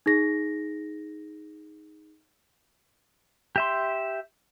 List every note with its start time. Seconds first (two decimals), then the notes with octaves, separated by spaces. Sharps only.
0.06 D#4 G#4 A#6
3.56 G4 E5 C6